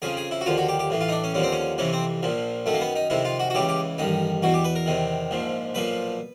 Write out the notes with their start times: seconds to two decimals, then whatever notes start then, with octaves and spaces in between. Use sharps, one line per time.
0.02 F2 C#3 F3 G#4
0.17 G#4
0.31 E4
0.41 F#4
0.46 D#2 D3 F3 F4
0.57 F#4
0.69 G4
0.79 G4
0.90 A1 A2 E3
1.01 F4
1.09 D#4
1.12 D4
1.24 C#4
1.34 D#2 D3 F3 C#4
1.43 C4
1.52 C#4
1.78 F2 C3 E3 C#4
1.93 C4
2.23 A#1 A#2 F3
2.66 F#2 D#3 A3
2.74 A#3
2.81 B3
2.96 D#4
3.10 F2 C3 D#3 E4
3.25 F4
3.40 F#4
3.50 F#4
3.54 C#2 C#3 E3 G4
3.69 G4
3.98 A1 G2 D#3 D#4
4.42 E2 B2 F#4
4.54 G4
4.64 B4
4.75 A#4
4.86 E2 C3 D#3
5.31 A#1 G#2 F3
5.74 B1 A#2 F3 B4